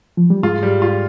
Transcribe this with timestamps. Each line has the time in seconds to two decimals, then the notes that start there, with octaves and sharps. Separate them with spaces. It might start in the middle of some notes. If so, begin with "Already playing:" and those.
0.17 F3
0.30 G3
0.43 G#2 G#3 F4
0.63 G3
0.82 F4